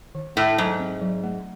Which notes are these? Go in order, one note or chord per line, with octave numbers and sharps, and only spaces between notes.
D#3
A2 A3
G#2 F#3
C4
F#3
A3